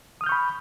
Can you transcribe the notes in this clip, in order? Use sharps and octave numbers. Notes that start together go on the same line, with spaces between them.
B5 C#6 D#6 F6 G6